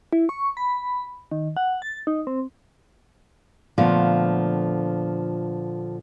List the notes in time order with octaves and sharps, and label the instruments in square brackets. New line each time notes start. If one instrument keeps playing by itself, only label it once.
[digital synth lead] E4
C#6
B5
D#3
F#5
A6
D#4
C4
[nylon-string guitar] A#2 D3 F3 A3 B3